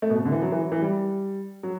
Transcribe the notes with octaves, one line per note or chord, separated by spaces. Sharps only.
A3
B2
C3
D3
E3
F#3
E3
F#3
E3
G3
F#3